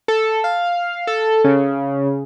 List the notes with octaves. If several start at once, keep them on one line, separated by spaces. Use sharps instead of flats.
A4
F5
A4
C#3